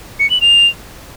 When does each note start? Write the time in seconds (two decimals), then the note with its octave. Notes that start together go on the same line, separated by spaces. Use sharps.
0.19 C#7
0.30 F#7
0.41 F7